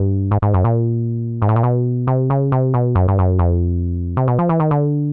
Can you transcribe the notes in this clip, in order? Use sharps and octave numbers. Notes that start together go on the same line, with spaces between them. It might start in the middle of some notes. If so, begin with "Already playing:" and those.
Already playing: G2
G#2
G#2
F#2
A#2
G#2
A2
A#2
B2
C3
C#3
C3
B2
F#2
G2
F#2
F2
C3
B2
F3
E3
D#3
D3